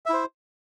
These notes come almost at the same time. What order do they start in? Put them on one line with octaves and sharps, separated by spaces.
E5 E4 C5